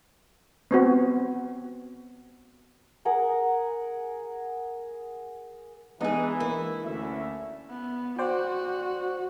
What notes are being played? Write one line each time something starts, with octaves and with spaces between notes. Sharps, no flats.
B3 C4 F#4
G#4 A#4 F#5
E3 G#3 B3 D4 D#4 G#4
A#3 E4
D2 C#4 E5
B3
F#4 C5 D5 G5